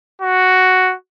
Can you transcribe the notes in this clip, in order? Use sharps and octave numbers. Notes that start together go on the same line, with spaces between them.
F#4